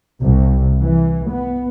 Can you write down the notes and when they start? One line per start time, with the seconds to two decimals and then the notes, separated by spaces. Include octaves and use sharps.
0.21 C2
0.82 E3
1.30 B3